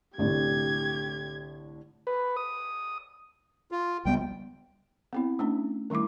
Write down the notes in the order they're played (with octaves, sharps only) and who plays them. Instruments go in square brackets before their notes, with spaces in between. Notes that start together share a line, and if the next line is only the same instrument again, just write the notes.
[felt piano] C2 A2 D3 [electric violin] G4 G#6
[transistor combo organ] B4
D#6
[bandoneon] F4
[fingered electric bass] C#2 G3 B3 [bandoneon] G5
[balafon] B3 C4 E4
A3 C#4 D4
D#3 G3 A3 E4 D6